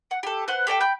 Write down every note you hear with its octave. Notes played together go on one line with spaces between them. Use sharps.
F#5
G4 A4
B4 C5 F#5
G4 A4 D5 G5
G5 B5 G6